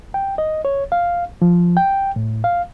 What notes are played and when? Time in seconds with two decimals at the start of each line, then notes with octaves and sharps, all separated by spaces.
0.14 G5
0.38 D#5
0.65 C#5
0.92 F5
1.42 F3
1.77 G5
2.16 A2
2.44 F5